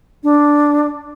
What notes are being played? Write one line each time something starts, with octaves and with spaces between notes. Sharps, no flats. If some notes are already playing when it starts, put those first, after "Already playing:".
D4